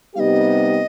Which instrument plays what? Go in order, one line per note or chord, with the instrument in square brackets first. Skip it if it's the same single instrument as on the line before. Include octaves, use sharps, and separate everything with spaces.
[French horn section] C3 G3 B3 D#4 G4 [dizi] D#5 F5